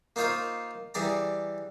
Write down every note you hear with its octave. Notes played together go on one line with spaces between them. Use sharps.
A#3 D#4 F4 C5 C#5 F5
E3 G3 G#4 D5 A#5